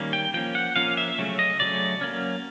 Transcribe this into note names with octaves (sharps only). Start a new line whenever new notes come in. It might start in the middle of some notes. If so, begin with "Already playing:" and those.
Already playing: D#3 G3 A#3 C#4
G5
F3 A#3 C#4 G5
F#5
F3 A#3 C#4 F5
E5
C#3 F#3 A3 C#4
D#5
C#3 F#3 A3 C#4 D5
F#3 A#3 C#4